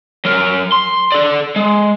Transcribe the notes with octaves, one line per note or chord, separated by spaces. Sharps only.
F#3 A#4
C6
A4 D5
G#3